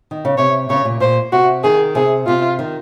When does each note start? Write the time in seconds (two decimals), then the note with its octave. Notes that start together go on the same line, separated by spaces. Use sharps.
0.11 D#3
0.25 C#3
0.38 C3 C#5
0.70 C#3 C#5
0.85 A#2
1.00 A#2 C5
1.32 C3 F#4
1.64 D#3 G#4
1.95 C3 G#4
2.27 C3 F4
2.59 D#3